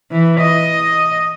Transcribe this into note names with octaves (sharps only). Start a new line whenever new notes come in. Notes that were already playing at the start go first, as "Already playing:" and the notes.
E3
D#5